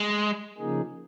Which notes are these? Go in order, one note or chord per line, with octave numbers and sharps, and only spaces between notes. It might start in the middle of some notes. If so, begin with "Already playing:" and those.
Already playing: G#3
C#3 F3 A#3 D#4 G#4